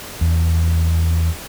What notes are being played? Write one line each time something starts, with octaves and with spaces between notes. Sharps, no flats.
E2